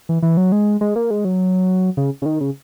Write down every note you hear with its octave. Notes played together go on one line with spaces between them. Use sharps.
E3
E3
F#3
G#3
G#3
A#3
G#3
F#3
C#3
C#3
D#3
C#3